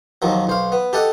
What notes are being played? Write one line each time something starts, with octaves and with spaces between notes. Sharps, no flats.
D#2 D#3 F3 F#3
B1 C5 F5
B3
G4 A4 D#5 F#5